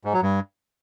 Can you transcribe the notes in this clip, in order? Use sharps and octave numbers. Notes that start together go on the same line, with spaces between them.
G#2
F#3
G2